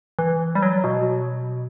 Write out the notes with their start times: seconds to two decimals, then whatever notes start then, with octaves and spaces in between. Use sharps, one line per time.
0.19 E3
0.55 G3
0.62 F#3
0.84 B2